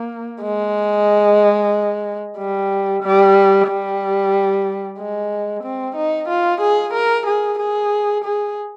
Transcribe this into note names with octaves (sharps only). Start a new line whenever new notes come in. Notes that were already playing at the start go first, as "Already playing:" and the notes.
Already playing: A#3
G#3
G3
G3
G3
G#3
C4
D#4
F4
G#4
A#4
G#4
G#4
G#4